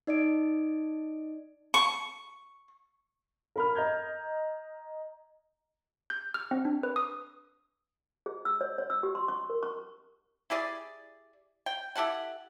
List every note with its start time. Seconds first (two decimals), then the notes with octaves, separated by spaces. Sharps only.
0.07 D#4 D5 D#5 D7
1.74 C#6
3.56 A#4 B5 F6
3.75 D#5 A#5 G6 G#6
6.10 G6
6.34 F6
6.51 C4
6.65 D4
6.83 B4
6.96 D#6
8.26 G#4
8.45 E6
8.61 C#5
8.78 C#5
8.90 E6
9.03 G4
9.15 C6
9.28 C#6
9.50 A#4
9.63 C#6
10.50 E4 G4 G#4 D5
11.66 G5
11.96 E4 G4 A4 F#5